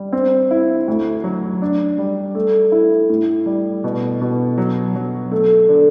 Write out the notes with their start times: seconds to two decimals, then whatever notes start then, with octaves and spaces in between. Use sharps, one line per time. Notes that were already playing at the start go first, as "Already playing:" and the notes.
Already playing: G3
0.13 C4
0.51 E4
0.88 D2
1.24 F#3
1.62 D4
1.98 G3
2.35 A3
2.72 E4
3.10 A2
3.46 G3
3.84 B2
4.21 B2
4.58 F#3
4.95 F#3
5.31 A3
5.69 D3